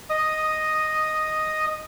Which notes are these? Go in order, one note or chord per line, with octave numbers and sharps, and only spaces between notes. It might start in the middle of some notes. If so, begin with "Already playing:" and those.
D#5 D#6